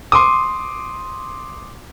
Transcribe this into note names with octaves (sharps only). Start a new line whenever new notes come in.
C6 D6 D#6